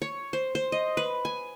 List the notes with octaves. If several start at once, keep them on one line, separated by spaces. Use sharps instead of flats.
C#5
C5
C5
D#5
B4
G#5